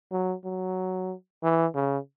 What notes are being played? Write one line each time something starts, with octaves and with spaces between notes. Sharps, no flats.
F#3
F#3
E3
C#3